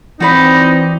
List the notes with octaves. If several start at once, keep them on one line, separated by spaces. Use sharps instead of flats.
E3 C4 D#4 F#4 D5 B5